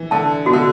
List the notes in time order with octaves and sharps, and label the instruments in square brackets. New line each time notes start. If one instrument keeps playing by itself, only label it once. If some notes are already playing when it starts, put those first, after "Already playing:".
Already playing: [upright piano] E3
[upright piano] D3 [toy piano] A5
[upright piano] B2 [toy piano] F#4
[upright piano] D3